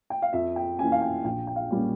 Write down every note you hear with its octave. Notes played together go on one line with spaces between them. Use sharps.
G5
F5
F2 E5
G5
E3 A#3 C#4 G#5
F5
G5
A#1 G5
G5
F5
A#2 G3 A#3 C#4